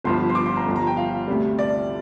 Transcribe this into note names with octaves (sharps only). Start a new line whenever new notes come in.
G1 G2 F3 C6
C6
D6
C6
A#5
G1 G2 F3
A#5
G5
F5
D2 C3 G3
D5